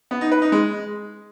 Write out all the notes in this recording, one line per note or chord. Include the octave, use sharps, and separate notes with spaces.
B3
D#4
B4
D#4
G#3